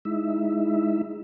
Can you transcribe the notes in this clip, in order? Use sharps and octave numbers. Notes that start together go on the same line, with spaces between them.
G#3 D#4 E4 E5